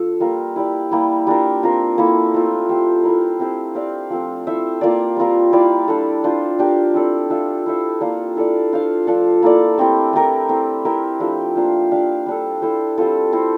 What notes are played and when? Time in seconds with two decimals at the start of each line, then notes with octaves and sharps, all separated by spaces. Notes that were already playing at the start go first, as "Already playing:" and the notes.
Already playing: F3 D4 A4
0.20 G3 A#3 F4 A#4
0.56 E4 G4 D5
0.91 G3 A#3 E4 G4
1.27 G3 D4 F4 A#4
1.63 C4 F4 A#4
1.98 A#3 E4 A4
2.34 A3 C4 F4
2.69 C4 G4 C5
3.04 A3 E4 A#4
3.40 C4 E4 G4 C5
3.75 C4 G4 D5 F5
4.10 F3 A3 C4
4.47 E4 A4 C5 E5
4.81 A#3 F4 A#4 D5
5.17 G3 C4 F4 A#4
5.53 E4 G4 D5 F5
5.88 G3 D4 A4
6.24 D4 F4 C5
6.59 D4 G4 A#4 F5
6.94 C4 E4 A4 D5
7.30 D4 F4 A4 E5
7.66 E4 A4 C5 E5
8.01 A#3 F4 A4 D5
8.37 E4 A4 D5 F5
8.72 D4 F4 C5 F5
9.07 F3 A3 D4 A4
9.43 A#3 E4 A4 D5
9.78 A3 C4 E4 G4
10.13 A3 E4 G4 A#4
10.49 A3 C4 E4
10.85 C4 E4 G4 A#4
11.20 F3 A3 D4 G4
11.55 A#3 D4 F4 C5
11.91 D4 G4 D5 F5
12.26 G3 D4 A4
12.62 E4 A4 C5
12.98 G3 C4 F4 A4
13.33 C4 E4 A4 C5